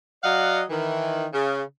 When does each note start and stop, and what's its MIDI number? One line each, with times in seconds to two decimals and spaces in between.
0.24 0.63 54
0.24 0.63 74
0.24 0.63 75
0.24 0.63 77
0.24 0.63 78
0.70 1.26 51
0.70 1.26 52
1.33 1.61 49